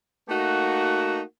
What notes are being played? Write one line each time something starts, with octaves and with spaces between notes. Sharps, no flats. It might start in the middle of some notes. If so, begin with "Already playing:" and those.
A3 A#3 D#4 F#4